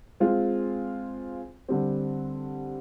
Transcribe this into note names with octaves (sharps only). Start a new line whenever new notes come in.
G#3 C4 F4
D3 G3 C4